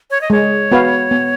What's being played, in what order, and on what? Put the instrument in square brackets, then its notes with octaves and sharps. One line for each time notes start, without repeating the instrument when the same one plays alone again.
[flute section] C#5
D#5
[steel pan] G#3 [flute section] C#5
[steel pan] B3 F#4 B4 F5
B3